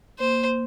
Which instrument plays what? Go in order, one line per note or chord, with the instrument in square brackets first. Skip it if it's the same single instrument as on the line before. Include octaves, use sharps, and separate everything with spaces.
[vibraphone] A#3 [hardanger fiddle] C5